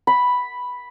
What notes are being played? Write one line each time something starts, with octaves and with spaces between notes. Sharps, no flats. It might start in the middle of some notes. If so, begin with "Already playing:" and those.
B5